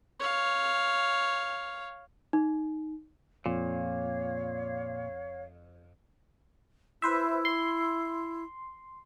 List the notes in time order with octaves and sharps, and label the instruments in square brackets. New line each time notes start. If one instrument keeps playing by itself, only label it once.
[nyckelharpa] C#5 F5
[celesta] D#4
[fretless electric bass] F2 [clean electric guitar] A#2 [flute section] C#5 F5
[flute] E4 [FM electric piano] B4 C5 E5
[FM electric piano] C6